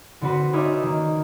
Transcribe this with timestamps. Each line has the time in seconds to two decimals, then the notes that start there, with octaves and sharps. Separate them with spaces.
0.21 D3 C4 F#4 B4 C5
0.53 C#4 D#4 B4 D5 E5
0.83 D#3 A#3